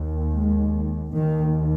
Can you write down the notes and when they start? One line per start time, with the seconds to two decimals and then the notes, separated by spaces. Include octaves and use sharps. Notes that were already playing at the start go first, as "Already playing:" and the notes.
Already playing: D#2
0.34 G#3
1.16 D#2 D#3